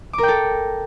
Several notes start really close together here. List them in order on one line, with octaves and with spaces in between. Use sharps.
D6 A#4 G5 A4